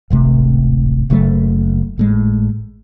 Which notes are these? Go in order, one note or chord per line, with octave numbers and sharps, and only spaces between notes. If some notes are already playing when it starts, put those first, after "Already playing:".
D1 G#1 C3 A3
F#1 C#3 F#3 A3
G#1 A2 G#3